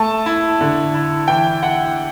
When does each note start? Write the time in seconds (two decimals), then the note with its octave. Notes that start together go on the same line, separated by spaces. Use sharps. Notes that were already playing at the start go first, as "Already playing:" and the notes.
Already playing: A3 A5
0.26 E4
0.61 D3
0.95 E4
1.28 E3 G5
1.63 E4 F#5